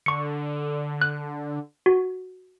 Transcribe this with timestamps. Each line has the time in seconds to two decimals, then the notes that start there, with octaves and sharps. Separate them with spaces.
0.06 D3 C#6 C#7
1.01 F#6
1.86 F#4